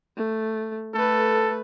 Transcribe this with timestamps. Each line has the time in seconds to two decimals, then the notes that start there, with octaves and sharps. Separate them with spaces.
0.17 A3
0.94 A3 A4 B4